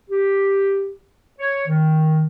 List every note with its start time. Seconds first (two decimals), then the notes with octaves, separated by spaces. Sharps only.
0.10 G4
1.39 C#5
1.68 D#3